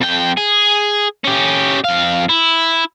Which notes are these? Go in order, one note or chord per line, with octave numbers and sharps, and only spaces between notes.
F2 G5
G#4
C#4 G4
F2 F5
E4